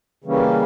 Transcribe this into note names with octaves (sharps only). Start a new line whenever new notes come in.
C#3 E3 G3 A#3 C#4